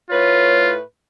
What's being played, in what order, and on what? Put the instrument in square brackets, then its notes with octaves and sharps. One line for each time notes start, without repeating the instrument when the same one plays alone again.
[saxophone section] A2 A3 B4 [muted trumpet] F4 [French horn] C#5